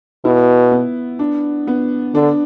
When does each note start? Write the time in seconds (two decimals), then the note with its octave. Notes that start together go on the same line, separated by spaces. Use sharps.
0.25 B2 E4
0.72 B3
1.19 D4
1.67 B3
2.14 D3 D4